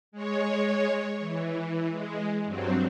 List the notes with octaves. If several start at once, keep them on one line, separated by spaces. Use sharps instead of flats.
G#3 C#5
E3
G#3
G2 F#3 C4